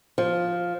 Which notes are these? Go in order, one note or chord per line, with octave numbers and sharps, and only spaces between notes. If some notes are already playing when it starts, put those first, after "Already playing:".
F3